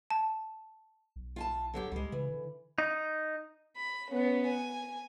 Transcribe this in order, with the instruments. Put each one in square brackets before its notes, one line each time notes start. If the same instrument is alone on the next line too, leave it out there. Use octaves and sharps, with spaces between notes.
[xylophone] A5
[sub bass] B1
[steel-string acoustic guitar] F4 G#5 A5
D3 F#3 G4
[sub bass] C#2 [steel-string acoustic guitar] G3 G#3
[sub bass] C#3 [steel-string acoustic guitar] E3
[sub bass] D3
[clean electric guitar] D#4
[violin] B5
B3 C#4
G#5